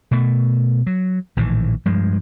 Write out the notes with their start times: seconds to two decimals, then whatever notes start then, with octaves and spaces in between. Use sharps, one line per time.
0.11 B2 A3
0.87 F#3
1.37 A#1 A2 D#3 E3
1.86 G2 F3 G#3